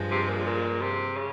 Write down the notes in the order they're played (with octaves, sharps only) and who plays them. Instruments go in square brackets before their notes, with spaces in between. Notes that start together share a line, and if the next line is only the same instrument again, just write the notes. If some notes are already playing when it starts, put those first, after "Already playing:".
Already playing: [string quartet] G2 F3 G#3
[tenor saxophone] C3
A#2
A#2
C3
C#3